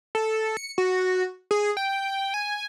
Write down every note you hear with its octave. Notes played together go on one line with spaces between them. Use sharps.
A4
C#7
F#4
G#4
G5
G#5